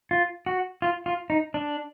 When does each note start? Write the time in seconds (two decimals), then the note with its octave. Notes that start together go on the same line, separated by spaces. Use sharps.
0.11 F4
0.46 F#4
0.82 F4
1.06 F4
1.30 D#4
1.54 D4